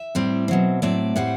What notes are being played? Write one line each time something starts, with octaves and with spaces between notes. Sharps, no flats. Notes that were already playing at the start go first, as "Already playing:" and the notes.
Already playing: E5
A2 G3 C4
B2 F#3 C4
A2 F#3 A3 C4 D5
A2 G3 C4 F#5